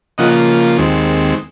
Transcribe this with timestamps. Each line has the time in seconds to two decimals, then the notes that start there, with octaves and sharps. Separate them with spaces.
0.18 C#3 F3 A#3 F4 D#5 F#5
0.78 D#2 D#3 G#3 C4